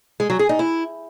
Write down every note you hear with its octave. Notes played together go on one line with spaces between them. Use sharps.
G#3
F#3
G#4
D#4
E4